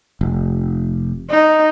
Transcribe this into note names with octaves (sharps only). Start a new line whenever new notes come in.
F1
D#4